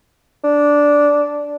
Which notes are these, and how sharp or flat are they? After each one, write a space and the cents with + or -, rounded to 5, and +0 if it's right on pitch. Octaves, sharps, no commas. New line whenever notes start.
D4 -10